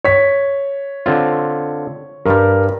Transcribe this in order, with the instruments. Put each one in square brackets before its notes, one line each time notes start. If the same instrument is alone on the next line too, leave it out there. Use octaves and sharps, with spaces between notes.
[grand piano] C#5 B6
[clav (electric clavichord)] D3 C4 F4
[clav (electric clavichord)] G2 G3 [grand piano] A#4